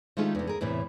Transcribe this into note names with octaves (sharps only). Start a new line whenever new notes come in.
D#3 G#3 A3 D#4 F4 G4
E2 C3
G#4 A#4
E2 A2 C3 E3